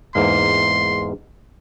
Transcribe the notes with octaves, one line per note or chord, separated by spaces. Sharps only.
E2 G#2 A#3 C6